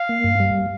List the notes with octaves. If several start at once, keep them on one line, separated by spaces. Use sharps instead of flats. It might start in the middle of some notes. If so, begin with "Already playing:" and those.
Already playing: F5
A#3
G2
G3